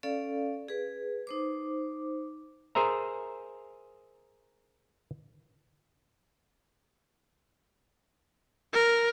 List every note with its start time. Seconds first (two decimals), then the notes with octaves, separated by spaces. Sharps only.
0.03 C#4 A4 D5 F5
0.68 G#4 B4
1.27 D#4 C5 D6
2.75 G#4 A#4 C5 E5 A#5
8.73 A#4